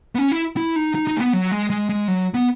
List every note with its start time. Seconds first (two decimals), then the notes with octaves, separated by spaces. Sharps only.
0.15 B3
0.19 C#4
0.32 E4
0.57 E4
0.76 D#4
0.95 D#4
1.07 D#4
1.17 A3
1.20 B3
1.33 F#3
1.52 G#3
1.70 G#3
1.89 G#3
2.08 F#3
2.34 B3